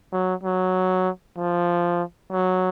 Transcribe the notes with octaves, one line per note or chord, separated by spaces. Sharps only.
F#3
F#3
F3
F#3